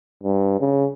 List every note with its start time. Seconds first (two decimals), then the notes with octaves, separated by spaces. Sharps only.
0.23 G2
0.60 C#3